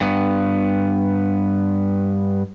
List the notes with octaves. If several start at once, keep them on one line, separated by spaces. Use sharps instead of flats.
G2 B3